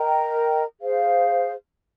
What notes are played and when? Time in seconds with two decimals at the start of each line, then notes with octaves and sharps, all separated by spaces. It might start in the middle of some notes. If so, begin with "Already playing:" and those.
Already playing: A#4 D#5 G5 A#5
0.81 G#4 C5 F5